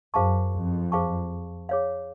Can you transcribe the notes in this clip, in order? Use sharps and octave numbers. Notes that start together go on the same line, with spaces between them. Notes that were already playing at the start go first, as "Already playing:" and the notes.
F#2 G#4 C5 F5 A5 C#6
F2
G#4 C5 F5 A5 C#6
G#4 C#5 F5